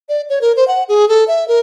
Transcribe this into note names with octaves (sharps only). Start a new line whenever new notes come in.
D5
C#5
A#4
C5
F#5
G#4
A4
E5
A#4